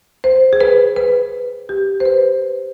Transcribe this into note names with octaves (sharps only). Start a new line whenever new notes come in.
C5
G#4
B4
B4
G4
C5
B4